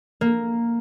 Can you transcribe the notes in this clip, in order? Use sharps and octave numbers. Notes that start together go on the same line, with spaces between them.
A#3